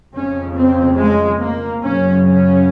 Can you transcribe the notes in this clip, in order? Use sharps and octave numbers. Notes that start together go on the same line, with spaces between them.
F2 C#3 C#4
C4
G#3
A#3
F#2 C#3 C#4
C#4